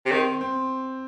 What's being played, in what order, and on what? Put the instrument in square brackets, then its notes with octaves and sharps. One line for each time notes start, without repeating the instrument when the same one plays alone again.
[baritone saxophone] C3
[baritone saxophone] D#3 [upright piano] C4
[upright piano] C4